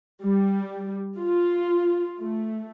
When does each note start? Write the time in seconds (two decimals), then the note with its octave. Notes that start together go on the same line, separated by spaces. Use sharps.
0.23 G3
1.19 F4
2.21 A3